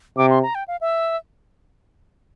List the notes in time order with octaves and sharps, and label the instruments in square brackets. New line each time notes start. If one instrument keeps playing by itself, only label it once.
[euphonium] C3 [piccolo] D6
[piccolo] C6
A#5
G5
F5
E5